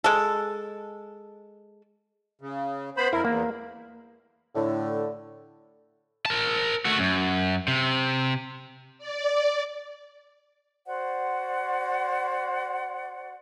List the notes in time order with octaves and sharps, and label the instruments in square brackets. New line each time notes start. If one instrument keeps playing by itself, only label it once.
[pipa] G#3 A4
[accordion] C#3
B3 C5 B5
[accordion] F2 A#4 [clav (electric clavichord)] E4
[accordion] E2 [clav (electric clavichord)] A#3
[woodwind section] A2 D3
[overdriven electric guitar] A#4 A5
A3 F#4
F#2
C3
[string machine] D5
[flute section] F#4 C5 D5 F#5